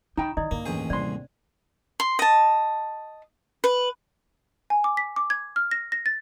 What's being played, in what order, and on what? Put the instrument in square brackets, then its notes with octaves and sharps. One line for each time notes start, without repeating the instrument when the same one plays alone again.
[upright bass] C#3 [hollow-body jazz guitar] D#4 G5 [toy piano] A#5 B5 C#6
[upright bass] D#3 [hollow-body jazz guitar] D#4 [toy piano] E4 D5 D#5
[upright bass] G2 D3 [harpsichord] A#3
[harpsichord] A1 D#2 G#4 [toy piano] D4
[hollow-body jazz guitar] C2 C6 [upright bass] C3 [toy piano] C5 D5
[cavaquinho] C6
D#5 A5
B4
[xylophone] G#5
D6
B6
D6
G#6
F6
A#6
A#6
A6